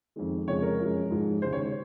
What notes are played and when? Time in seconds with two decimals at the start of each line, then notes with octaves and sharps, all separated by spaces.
0.16 F2 D#3 G#3
0.47 F2 C#3 F3 G#3 C#5
0.62 A#4
0.79 F#2 F3 G#3
1.10 G#2 F3 G#3
1.42 D#2 C#3 G#3 C5
1.53 C#5